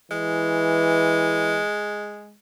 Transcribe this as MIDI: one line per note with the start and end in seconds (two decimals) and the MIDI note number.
0.11 1.62 52
0.11 2.36 56